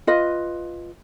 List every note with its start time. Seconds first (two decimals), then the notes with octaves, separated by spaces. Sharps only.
0.07 F4 B4 D#5